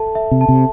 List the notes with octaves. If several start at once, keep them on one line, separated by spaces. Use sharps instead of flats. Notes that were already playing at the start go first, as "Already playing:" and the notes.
Already playing: A4 E5 A5
E5
C3
A5
C3